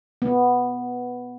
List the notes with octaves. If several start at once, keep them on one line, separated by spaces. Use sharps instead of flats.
B3